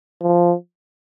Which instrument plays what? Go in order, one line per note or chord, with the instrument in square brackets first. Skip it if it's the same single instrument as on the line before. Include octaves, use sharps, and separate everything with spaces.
[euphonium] F3